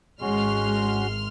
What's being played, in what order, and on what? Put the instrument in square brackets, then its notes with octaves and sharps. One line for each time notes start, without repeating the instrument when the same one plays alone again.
[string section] G#1 C6 F6 [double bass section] G#3 [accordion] C#4 F#4